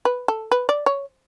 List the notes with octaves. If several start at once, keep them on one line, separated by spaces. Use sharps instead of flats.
B4
A4
B4
D5
C#5